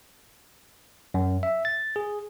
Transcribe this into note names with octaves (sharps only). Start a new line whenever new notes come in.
F#2
E5
A6
G#4